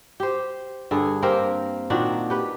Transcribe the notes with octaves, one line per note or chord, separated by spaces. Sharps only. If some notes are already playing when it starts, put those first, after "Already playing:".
G4 C5
G2 D3 G#4
A#3 C4 G4 A#4
A#2 D#3 D4 F#4
G4 B4